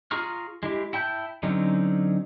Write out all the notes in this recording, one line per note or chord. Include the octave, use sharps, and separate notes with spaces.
F4 G#4 A#5 C#6 F6
G#3 E4 G4
E4 G5 A5 G6
D3 F#3 C4 C#4 D#4